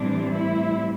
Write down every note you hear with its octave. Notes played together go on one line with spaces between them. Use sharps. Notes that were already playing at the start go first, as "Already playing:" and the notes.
Already playing: A2 E3 G3 C4 D4
E4